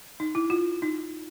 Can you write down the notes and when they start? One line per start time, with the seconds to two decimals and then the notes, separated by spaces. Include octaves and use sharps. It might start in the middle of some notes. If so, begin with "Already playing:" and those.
0.20 D#4
0.35 E4
0.50 F4
0.82 D#4